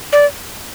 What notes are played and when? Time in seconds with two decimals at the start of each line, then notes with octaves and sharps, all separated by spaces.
0.13 D5